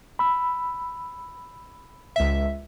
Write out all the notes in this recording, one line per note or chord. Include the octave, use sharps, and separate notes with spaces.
B5 E6
C#2 E5